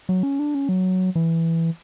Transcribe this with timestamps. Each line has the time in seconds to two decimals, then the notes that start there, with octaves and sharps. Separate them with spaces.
0.09 F#3
0.23 C#4
0.39 D4
0.55 C#4
0.69 F#3
1.15 E3